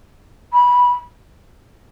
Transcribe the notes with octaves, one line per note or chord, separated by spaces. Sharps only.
B5